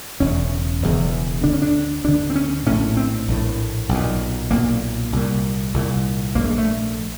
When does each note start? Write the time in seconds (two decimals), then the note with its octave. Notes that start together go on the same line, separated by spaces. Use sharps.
0.20 E1 E2 C#3 C#4
0.82 E1 E2 C#3
1.43 D2 D3 D4
1.53 C#4
1.62 D4
2.05 D2 D3 D4
2.30 C4
2.35 C#4
2.66 A#1 A2 C#4
2.97 C4
3.28 A#1 A2
3.89 B1
3.94 A#2
4.51 B1 A#2 A#3
5.13 C2 A#2
5.74 C2 A#2
6.35 A#1 A#3
6.39 G#2 A3
6.51 G#3
6.58 A3